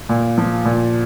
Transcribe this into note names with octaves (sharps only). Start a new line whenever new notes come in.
A#2
F3
A#2